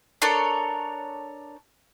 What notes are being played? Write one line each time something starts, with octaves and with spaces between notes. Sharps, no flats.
D4 A4 A#4 C#5